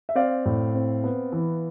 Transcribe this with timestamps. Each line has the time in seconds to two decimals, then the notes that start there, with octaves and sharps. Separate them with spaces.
0.09 E5
0.15 C4 D5 F5
0.45 A2
0.75 C4
1.04 B3
1.32 E3